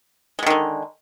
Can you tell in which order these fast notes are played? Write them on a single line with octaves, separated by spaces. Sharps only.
G#3 B2 D#3 D3